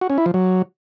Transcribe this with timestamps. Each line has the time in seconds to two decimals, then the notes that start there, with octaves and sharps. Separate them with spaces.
0.01 F#4
0.10 C#4
0.18 E4
0.26 F3
0.34 F#3